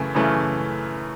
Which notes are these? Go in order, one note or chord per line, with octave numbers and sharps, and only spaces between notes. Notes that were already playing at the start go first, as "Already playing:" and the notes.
Already playing: F#2 C#3 E3 A3
F#2 C#3 E3 A3